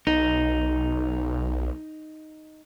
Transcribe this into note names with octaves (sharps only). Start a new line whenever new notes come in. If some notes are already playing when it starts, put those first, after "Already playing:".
B1 D#4